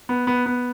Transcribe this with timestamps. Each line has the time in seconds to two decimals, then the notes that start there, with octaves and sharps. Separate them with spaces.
0.09 B3
0.27 B3
0.46 B3